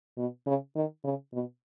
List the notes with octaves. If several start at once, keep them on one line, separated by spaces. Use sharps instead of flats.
B2
C#3
D#3
C#3
B2